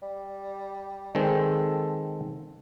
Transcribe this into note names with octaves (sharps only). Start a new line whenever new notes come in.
G3
D#3 G#3 C4 A4